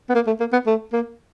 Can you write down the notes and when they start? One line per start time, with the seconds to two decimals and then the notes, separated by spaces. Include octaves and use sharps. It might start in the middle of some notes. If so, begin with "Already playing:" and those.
0.09 B3
0.15 A#3
0.27 A3
0.40 A#3
0.53 B3
0.66 A3
0.93 A#3